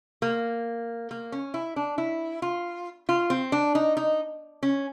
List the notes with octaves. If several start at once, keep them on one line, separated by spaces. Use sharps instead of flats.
A#3
A#3
C#4
E4
D4
E4
F4
F4
C4
D4
D#4
D#4
C#4